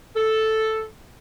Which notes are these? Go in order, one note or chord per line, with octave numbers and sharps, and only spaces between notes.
A4